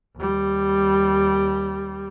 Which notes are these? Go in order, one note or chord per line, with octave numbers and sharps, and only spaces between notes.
D#2 G3